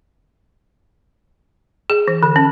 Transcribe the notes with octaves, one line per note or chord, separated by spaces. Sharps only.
G#4
E3
D3
C#4